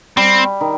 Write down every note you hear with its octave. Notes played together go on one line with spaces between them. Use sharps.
G3 C4
D#3